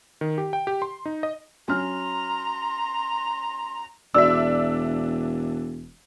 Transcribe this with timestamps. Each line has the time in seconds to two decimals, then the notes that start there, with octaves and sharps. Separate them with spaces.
0.21 D#3
0.38 G4
0.53 G5
0.67 G4
0.82 C6
1.06 D#4
1.23 D#5
1.68 F#3 C#4 A#5 C6 F6
4.14 E1 D4 F#4 D5 E5 E6